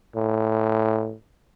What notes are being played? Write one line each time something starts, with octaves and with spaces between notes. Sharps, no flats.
A2